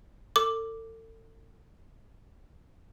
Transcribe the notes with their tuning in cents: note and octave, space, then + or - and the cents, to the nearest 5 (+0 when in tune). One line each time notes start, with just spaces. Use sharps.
A4 +35 D6 +0